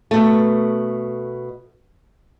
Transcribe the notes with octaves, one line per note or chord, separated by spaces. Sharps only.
B2 A3